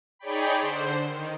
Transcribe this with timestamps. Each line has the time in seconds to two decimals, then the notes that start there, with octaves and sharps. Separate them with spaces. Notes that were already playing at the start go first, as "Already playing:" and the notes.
0.19 D#4 G#4 C#5 D5 G5 B5
0.58 D3 C5
1.05 D#3